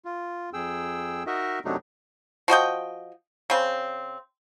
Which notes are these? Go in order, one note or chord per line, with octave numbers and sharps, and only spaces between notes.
F4
F2 G#4 G5 E6
D#4 F#4 A#4 D#5 E5
F#2 C3 F#3 A3 D4 D#4
F3 F#4 D#5 G5
C#3 C4